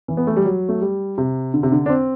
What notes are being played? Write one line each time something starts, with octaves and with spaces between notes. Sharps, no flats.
E3
B3
A3
G3
F#3
A3
G3
C3
D3
C3
D3
D4
C4